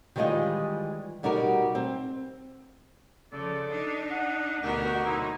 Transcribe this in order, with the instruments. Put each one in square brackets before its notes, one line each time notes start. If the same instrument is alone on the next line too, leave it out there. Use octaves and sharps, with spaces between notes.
[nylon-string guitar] D#3 E3 G3 G#3 F4 D#5
B2 G3 D#4 F#4 A#4
C4
[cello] C#3 F3 [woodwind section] A4 D5
[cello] D4 D#4
[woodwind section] F#5
[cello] D2 B2 [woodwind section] D#4 G4 [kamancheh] F#4 A#4
[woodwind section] C3 F#3 E4 [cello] D#4